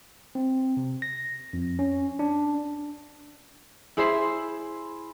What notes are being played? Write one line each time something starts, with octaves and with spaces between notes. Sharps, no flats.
C4
C3
A#6
F2
C#4
D4
E4 G#4 C5 E5 B5 C6